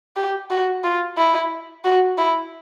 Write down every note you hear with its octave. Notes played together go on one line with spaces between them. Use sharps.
G4
F#4
F4
E4
F#4
E4